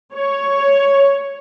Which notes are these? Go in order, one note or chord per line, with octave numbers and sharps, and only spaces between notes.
C#5